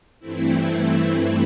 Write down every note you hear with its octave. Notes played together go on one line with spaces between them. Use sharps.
G2 E3 A3 C4 E4